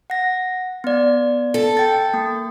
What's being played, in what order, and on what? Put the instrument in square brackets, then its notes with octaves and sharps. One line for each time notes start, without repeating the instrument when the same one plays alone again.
[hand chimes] F#5 A#6
B3 D5
[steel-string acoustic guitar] A4
[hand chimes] G5 A6
A#3